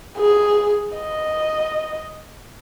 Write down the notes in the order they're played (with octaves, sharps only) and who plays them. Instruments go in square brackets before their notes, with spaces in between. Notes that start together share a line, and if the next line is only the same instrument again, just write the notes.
[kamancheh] G#4
D#5